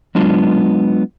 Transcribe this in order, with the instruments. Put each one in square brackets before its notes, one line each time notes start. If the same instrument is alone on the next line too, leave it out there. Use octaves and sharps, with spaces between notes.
[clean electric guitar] F#3 G#3 B3 D4 F4